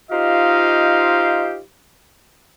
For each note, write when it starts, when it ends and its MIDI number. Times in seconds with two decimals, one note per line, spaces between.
0.11 1.60 63
0.11 1.60 65
0.11 1.60 67
0.11 1.60 72
0.11 1.60 75
0.11 1.60 77